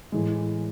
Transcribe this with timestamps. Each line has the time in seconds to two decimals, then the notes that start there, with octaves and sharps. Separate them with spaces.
0.12 A2 E3 G#3